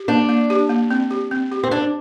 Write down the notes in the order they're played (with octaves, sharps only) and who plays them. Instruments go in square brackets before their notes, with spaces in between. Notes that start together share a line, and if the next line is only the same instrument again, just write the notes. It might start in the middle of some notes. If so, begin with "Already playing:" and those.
Already playing: [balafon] G4
[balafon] A#3 [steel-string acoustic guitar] D4
[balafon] A#3
G4
A#3
C4
G4
C4
G4
[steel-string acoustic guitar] C4
[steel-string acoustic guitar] D4 [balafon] C5